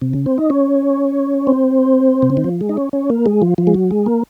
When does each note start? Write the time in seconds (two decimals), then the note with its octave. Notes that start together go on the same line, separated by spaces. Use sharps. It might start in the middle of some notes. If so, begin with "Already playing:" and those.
0.02 C3
0.13 C#3
0.26 C4
0.38 D#4
0.50 C#4
1.47 C4
2.22 C3
2.30 C#3
2.37 D#3
2.44 F3
2.61 G#3
2.69 D#4
2.77 C#4
2.93 C#4
3.10 A#3
3.26 G#3
3.42 F3
3.58 F3
3.67 G#3
3.74 F#3
3.91 G#3
4.06 A#3